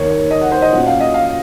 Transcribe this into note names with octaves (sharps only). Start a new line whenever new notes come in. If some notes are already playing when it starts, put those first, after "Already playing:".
Already playing: D#2 D#3 A#3 D#4 C#5
C#5
D#5
F#5
C5
D#5
A#2 F#3 C#4 F#5
F5
D#5
F5